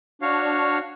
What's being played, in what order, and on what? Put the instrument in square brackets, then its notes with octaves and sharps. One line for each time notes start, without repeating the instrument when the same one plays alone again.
[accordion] D4 [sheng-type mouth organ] F#4 C#5 F5